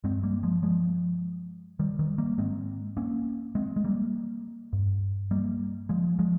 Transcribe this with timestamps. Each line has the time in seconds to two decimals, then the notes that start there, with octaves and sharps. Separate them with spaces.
0.04 G2 G#3 C4
0.23 G3 A#3
0.43 F3 G#3
0.63 F3 G#3
1.79 D#3 G3
1.99 D#3 G3
2.18 G3 A#3
2.38 G#2 G#3 C4
2.97 A#3 C#4
3.55 G#3 C4
3.76 G#3
3.84 G3 A#3
4.73 G2
5.31 G3 A#3
5.89 F3 G#3
6.19 F3 G#3